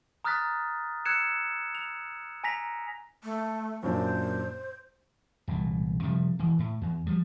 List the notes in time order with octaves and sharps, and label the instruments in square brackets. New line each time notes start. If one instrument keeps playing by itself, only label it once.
[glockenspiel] A#5 D#6 F6 F#6 A6 B6
E6 F#6 G#6 C#7 E7
F7
G#5 A#5 A#6 B6 F7
[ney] A3
[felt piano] F#2 A#2 D4 [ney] C5
[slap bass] E1 C2 A#2
C3 F3 G3
E1 E3
A2
E2
F3 G3